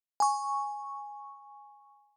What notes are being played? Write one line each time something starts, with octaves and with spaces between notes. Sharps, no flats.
G#5 C#6